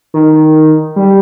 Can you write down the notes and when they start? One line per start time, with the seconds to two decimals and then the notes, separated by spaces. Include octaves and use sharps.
0.14 D#3
0.96 G3